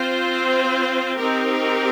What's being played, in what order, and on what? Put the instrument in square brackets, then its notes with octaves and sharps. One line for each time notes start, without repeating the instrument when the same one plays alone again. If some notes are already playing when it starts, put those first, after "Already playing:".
Already playing: [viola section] C4 F4 C5
C4 D#4 G4 A#4